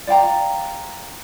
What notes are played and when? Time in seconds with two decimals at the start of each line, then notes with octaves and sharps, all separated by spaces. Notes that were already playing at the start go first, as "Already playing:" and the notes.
0.07 D5 F5 G5 A#5